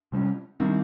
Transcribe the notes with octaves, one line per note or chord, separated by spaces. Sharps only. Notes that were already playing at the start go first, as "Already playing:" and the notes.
C3 G3 A#3 C#4
D#3 G3 C4